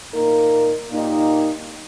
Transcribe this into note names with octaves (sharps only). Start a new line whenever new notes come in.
A#2 A#3 D#4 A#4
A#2 A#3 D#4 G4